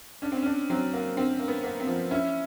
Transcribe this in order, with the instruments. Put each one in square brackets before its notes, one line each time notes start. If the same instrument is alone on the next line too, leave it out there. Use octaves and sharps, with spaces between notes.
[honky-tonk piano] C#4 [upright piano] D4
[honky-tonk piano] C4
[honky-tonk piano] C#4 [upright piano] D4
[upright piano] F#3 [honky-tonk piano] C4
[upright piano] A#3
[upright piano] D3 [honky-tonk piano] C4
[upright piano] A#3
[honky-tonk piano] B3
[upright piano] A#3
[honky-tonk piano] C4
[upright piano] F3
[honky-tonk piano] C#4 [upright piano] E4